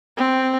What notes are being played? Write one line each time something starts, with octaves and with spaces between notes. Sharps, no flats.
C4